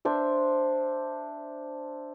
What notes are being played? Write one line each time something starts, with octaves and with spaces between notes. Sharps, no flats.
D4 C5 E5